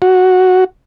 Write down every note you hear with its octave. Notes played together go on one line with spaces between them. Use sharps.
F#4